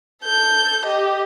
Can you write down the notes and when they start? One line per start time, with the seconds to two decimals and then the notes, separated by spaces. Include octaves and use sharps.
0.23 A4 G6
0.85 G4 D#5